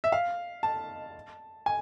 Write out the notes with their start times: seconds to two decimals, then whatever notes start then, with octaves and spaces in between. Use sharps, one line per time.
0.04 E5
0.12 F5
0.63 A5
1.66 G#5